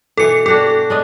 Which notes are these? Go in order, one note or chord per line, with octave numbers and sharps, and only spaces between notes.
B2 E3 A4 C#7
D4 F#4 G4 A4
G#3 D4 D#5